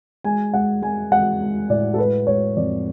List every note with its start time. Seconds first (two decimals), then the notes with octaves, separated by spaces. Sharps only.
0.24 G#3 G#5
0.54 G#3 F#5
0.82 G#3 G#5
1.12 G#3 F#5
1.41 G#3
1.70 A2 D5
1.94 A4
1.98 G#3 B4
2.27 G#3 C#5
2.56 F2 D5